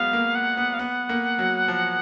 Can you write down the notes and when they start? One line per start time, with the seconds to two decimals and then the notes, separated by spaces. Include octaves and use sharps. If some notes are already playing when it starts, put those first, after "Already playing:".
Already playing: F#3 G#3 B3 F5
0.13 A#3
0.35 F#5
0.57 B3
0.74 F5
0.79 B3 F#5
1.09 A#3
1.39 F#3
1.68 F3